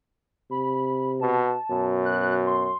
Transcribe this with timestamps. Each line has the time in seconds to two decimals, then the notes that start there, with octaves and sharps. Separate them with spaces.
0.51 C3 B5
1.21 B2 A5
1.70 F#2 B2
2.05 F#6
2.47 C6